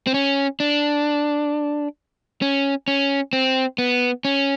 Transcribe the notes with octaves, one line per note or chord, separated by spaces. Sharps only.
C4
C#4
D4
C#4
C#4
C4
B3
C#4